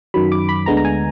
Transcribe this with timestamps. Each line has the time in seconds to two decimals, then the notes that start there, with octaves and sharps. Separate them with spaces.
0.14 F#2 D#3 F#3 B5
0.32 D6
0.49 B5
0.66 D2 D3 G#3 B3 A#5
0.77 A#5
0.85 G#5